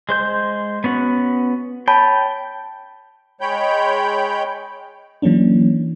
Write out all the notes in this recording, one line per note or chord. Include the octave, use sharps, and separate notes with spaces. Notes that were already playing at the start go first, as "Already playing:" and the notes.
G#3 C5 G6
B3 C#4 F#4
C#5 G5 A5 B5
G#3 C#5 G5 B5 G6
E3 F#3 A#3 C#4 D4